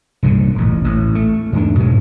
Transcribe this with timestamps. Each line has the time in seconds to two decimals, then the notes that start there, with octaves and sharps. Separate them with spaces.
0.23 C2 G2 A#2 D3
0.55 D#1 A1
0.84 A1
1.15 A3
1.53 E2 G#2 G#3 D4
1.79 G#2 B2 F#3 G#3